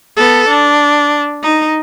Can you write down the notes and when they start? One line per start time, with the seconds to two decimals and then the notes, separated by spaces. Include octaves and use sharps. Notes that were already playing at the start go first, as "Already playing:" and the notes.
0.17 B3 A4
0.48 D4
1.43 D#4